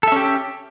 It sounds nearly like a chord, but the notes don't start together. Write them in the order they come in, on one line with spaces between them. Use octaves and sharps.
A4 E5 C#4 G4